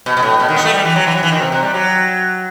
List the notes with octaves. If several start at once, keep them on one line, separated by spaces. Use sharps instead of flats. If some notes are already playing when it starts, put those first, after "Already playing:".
B2
B2
A2
B2
D#3
B3
A3
G3
E3
F#3
E3
F#3
E3
D#3
C3
C3
G3
F#3